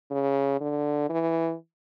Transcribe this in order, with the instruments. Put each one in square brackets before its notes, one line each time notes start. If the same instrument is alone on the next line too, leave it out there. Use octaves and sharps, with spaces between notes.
[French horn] C#3
D3
E3